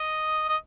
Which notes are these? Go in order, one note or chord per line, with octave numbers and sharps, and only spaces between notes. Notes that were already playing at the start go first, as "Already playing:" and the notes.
Already playing: D#5
D#5